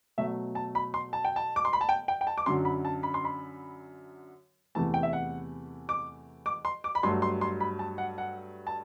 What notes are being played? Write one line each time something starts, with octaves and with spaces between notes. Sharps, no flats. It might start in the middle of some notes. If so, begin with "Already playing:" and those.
B2 F#3 A3 E5
A5
B5
C6
A5
G5
A5
D6
C6
B5
A5
G5
G5
G5
A5
D6
F#2 D3 F#3 C6
B5
A5
B5
C6
B5
E2 C3 E3 A3 A5
G5
E5
F#5
D6
D6
C6
D6
B5
G2 F#3 A3 C6
C6
C6
B5
A5
F#5
F#5
A5